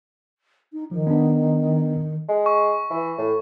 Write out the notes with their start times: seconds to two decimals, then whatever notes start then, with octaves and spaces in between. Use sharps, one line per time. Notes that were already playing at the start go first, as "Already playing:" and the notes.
0.73 D#4
0.91 D#3 F3
1.07 B3 D4
2.29 G#3
2.46 C#6
2.90 E3
3.18 A2